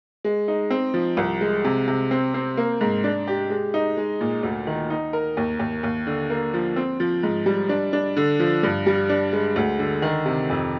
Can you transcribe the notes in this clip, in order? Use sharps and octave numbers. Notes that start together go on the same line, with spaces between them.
G#3
D#4
C4
F3
C2
G#3
C3
C3
C4
C4
A#3
G#2
D4
G4
G#3
D#4
G#3
A#2
D2
D#3
D#4
A#4
D#2
D#2
D#2
D3
A#3
F3
C4
F3
G#2
G3
D4
D4
D3
F3
G2
G3
D4
G#3
D2
D3
D#3
C3
F2